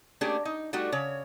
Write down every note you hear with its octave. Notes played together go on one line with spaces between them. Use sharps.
A3 A#3 C#4 D4 G4 G#4
D#4
G3 A3 D#4 F#4 G4
C#3 C#5